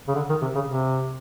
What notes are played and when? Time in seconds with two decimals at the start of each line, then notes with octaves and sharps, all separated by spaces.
0.08 C#3
0.15 D3
0.29 D#3
0.42 C3
0.55 C#3
0.67 C3